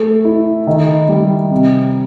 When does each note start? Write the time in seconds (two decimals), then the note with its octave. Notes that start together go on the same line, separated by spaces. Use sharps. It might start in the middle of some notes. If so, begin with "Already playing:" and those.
Already playing: A3
0.25 E4
0.67 D#3
1.09 G3
1.51 C3